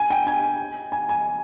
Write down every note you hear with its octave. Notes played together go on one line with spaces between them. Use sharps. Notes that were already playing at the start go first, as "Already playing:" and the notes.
Already playing: G#5
G5
G#5
G#5
G#5